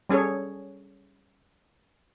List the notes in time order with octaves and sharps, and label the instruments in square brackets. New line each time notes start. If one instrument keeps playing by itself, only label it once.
[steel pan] G3 C#4 G#4 A4 C#5